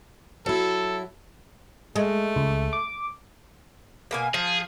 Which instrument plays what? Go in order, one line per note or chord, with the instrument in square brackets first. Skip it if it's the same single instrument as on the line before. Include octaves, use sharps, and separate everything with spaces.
[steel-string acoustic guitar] F#3 E4 [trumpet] A4
[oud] G#3 [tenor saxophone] A3
[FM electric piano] C#2
D6
[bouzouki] B2 A#3 G#5
[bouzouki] F3 [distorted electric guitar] G#4